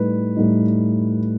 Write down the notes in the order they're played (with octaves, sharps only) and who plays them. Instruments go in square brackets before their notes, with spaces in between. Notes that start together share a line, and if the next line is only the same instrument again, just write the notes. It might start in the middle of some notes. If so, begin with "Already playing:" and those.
Already playing: [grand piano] A2 G3 D#4 B4
A2 G3 D#4